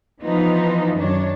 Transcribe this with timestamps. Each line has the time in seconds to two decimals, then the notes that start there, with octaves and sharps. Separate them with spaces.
0.21 E3 F3 B3 D#4 F4
0.96 F#2 D#3 D4 C#5